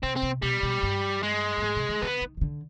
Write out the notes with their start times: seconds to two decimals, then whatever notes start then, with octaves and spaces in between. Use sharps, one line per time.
0.03 C3 C4
0.16 C4
0.23 C3
0.42 B2 G3
0.63 B2
0.83 G2
1.23 G#3
1.58 G2
1.62 G#2
1.76 C3
1.89 D#3
2.02 D3 B3
2.22 D#3
2.37 D#3
2.41 D3